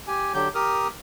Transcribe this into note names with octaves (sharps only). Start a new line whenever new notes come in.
G4 G#5
D3 F#3 G4 G6
G4 A#4 D#6 F6